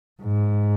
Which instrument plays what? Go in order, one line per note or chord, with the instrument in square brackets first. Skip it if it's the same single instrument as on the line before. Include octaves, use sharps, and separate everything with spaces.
[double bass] G#2